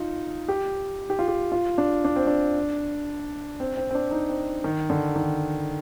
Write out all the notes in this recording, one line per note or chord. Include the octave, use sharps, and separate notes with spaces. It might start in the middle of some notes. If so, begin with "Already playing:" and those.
Already playing: D#4 F4
G4
G4
F4
G4
F4
D4
D4
C4
D4
C4
C4
C4
D4
D#4
C4
D#3
D3
D#3